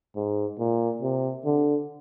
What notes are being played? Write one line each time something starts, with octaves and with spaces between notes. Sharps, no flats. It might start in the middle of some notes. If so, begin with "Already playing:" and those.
G#2
A#2
C3
D3